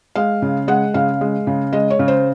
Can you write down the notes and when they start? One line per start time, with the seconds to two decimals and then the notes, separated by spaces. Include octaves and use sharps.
0.16 G#3 F5
0.42 C#3
0.68 G#3 F#5
0.94 C#3 F5
1.21 G#3
1.47 C#3
1.73 G#3 D#5
1.90 C#5
1.99 C#3
2.08 C5